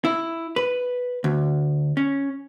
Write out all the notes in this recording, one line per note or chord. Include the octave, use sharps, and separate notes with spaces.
E4
B4
D2
C#4